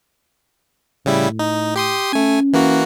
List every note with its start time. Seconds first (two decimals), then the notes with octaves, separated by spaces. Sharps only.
1.06 A2 C#3 G3 E4
1.39 D#4
1.76 G4 C6 D#6
2.13 A3 C#4 G#5
2.53 E3 A#3 F#4